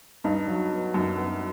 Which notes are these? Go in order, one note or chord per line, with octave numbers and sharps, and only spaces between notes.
G2 D#4
F#3
B3
F#2 D#4
B3